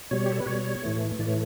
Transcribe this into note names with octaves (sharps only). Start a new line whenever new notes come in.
B2 G3 C#5
G4
A4
B4
B2 G3 C#5
A2 E3 A3
A2 E3 A3 D5
C#5